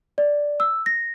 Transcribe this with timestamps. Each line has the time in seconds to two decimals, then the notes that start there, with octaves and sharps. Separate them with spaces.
0.18 D5
0.60 E6
0.86 A#6